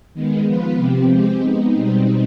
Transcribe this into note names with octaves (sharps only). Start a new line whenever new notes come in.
D#3 G#3 B3
F3 B3 F4 B4
C3 F3 C4 G4
G#3 C4 G4
G#3 B3 D#4
B2 G3 C4 D#4